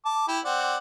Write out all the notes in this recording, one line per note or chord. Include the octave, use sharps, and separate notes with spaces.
A5 D6
E4 G4
C4 D5 F#5